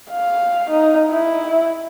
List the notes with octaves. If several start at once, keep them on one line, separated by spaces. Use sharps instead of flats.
F5
D#4
E4